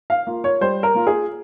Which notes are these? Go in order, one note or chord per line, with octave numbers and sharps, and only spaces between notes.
F5
A#3 F4
C#5
G3 C5
A#4
A#3 F4
G#4